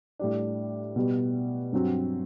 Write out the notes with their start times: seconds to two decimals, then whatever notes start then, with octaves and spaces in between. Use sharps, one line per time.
0.19 A2 G3 D4
0.96 B2 G3 B3
1.73 G2 F#3 C4 F#4